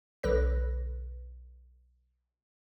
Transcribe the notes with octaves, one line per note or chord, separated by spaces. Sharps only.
B1 D3 B4 A#6